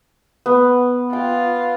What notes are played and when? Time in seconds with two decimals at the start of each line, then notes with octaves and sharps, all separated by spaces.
0.46 B3
1.13 F4 G5